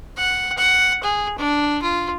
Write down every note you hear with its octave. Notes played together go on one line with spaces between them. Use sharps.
F#5
F#5
G#4
D4
F4